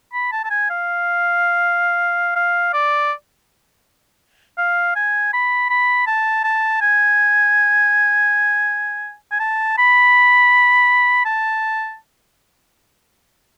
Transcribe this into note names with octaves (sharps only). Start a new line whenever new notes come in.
B5
A5
A5
G#5
F5
F5
D5
F5
G#5
B5
B5
A5
A5
G#5
G#5
A5
B5
A5